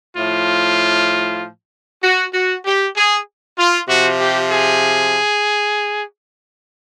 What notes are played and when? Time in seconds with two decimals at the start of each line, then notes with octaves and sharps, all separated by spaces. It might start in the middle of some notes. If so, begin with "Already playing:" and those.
0.17 A2 F3 F4
2.04 F#4
2.34 F#4
2.65 G4
2.97 G#4
3.58 F4
3.89 C3 F3 F#4
4.20 G4
4.51 G#4